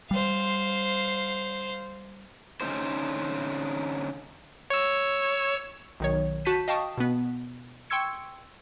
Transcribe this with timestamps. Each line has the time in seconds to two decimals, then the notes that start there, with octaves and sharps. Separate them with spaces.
0.11 G3 C5 F5
2.61 D3 C#4 D#4 C5
4.70 C#5 E6
6.00 B1 D#3 C#5
6.45 F#4 A5 G6 B6 D#7
6.68 D#5 F5 G5 A5 C#6 D#6
6.98 B2 B3
7.90 G5 C6 C#6 E6 G#6 C#7